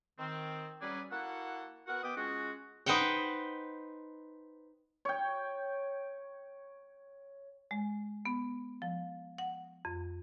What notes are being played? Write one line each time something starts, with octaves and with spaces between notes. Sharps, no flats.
D#3 C4
F#3 G3 C#4 G#4 B4 D5
A#3 E4 F#4 A4 F#5
B3 F#4 A#4 F#5
B2 B3 B4 G5 D6 D#6
G#3 C#4 F4 F#4
D#4 B4 C5 F#5 G5
C#5 G5
G#3
B3
F3
F#5
F2